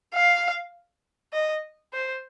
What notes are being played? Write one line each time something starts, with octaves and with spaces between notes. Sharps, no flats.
F5
D#5
C5